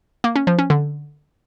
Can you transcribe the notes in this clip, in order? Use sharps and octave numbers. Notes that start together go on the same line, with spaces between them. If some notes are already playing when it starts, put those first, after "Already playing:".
A#3
C#4
F3
C#4
D3